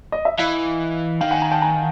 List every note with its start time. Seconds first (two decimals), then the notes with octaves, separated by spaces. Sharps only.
0.12 D#5
0.25 E5
0.38 E3 D#5 F5
1.21 D#3 F5 G5
1.31 F#5 G#5
1.42 G#5 A#5
1.52 G5 A5
1.62 G#5 A#5